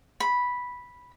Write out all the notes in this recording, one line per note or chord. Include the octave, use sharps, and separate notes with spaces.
B5